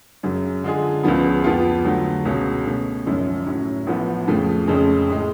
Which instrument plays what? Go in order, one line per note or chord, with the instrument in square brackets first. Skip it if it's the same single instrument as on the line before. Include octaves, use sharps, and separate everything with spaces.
[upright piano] F#2 C#3 F#3
D3 G#3 D4 F4 G#4
C#2 C#3 F3 B3
F2 F3 B3 F4
D3 F#3 A3
C#2 B2 F#3 C#4 F#4
B2 A3 C#4
G#1 F#2 C#3 F3 G#3
A2 F#3 C#4
A1 A2 F3 B3
F2 C#3 F3 A3 F4
F1 F2 C#3 G#3 C#4
A2 G#3